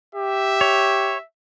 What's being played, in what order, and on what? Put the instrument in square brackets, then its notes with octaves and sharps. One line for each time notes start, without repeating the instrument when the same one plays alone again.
[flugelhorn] G4 [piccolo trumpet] E5
[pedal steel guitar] C#5